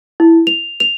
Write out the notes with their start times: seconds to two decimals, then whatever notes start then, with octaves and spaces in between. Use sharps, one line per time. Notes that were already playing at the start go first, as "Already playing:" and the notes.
0.20 E4
0.47 F7
0.80 F7